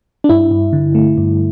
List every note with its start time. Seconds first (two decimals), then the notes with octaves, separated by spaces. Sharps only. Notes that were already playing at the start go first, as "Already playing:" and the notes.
0.24 D4
0.29 G2 E4
0.51 G2
0.73 D3
0.95 A3
1.18 G2